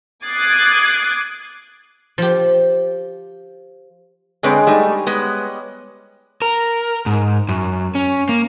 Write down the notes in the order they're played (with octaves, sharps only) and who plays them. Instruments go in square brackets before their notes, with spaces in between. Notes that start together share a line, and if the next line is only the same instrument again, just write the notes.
[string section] D6 D#6 F#6 G#6 A6 C7
[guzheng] F3 G4
[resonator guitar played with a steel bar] D3 C4 B4 [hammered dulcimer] G#3 C#5 D#5
[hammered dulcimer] G3 [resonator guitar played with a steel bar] A3 D#4
[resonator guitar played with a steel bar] G#3 B3
[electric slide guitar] A#4
G#2
F#2
C#4
A#3